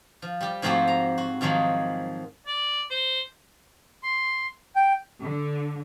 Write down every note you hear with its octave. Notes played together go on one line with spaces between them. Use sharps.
F3
G3 G4
G#2 F3 A3 C4 F#4 G4
A#5
F#4
G#2 D#3 F3 F#3 G#3
D5
C5
C6
G5
D3